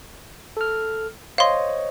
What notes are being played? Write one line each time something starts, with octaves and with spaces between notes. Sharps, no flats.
A4 F6
C5 C#5 D#5 F5 C6